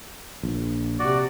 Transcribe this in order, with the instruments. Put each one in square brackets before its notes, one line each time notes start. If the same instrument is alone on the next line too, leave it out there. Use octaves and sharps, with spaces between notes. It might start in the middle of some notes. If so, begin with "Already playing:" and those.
[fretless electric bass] A#1
[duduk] C3 [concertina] F#4 D5